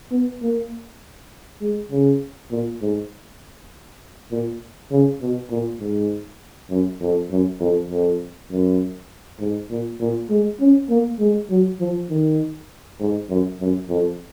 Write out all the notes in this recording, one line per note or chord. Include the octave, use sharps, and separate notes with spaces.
B3
A#3
G#3
C#3
A#2
G#2
A#2
C#3
B2
A#2
G#2
F#2
F2
F#2
F2
F2
F#2
G#2
A#2
A#2
G#3
C#4
A#3
G#3
F#3
F3
D#3
G#2
F#2
F#2
F2